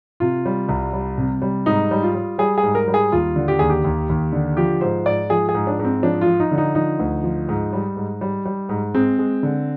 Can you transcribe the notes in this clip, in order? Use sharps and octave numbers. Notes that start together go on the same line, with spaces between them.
C3 F4
G3
C2
G3
C3
G3
G#2 D#4
G3
F4
G3
G3 G#4
G#4
G#2
A#4
G3
G#4
D#2 F4
D3
G4
D#2 G#4
G4
D#2
D#2
D3
F3 G4
G#2 C5
G#2 D5
F3 G#4
G#4
G#2
D4
G#2
C4
F3 D4
F4
F3
D#4
D3
D#4
F3 D#4
D2
F3
G#2
G3
G#2
G3
G3
G#2
G#3 C4
G#3
D3